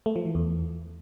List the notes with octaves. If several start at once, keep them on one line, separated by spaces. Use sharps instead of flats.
A3
F3
E3
E2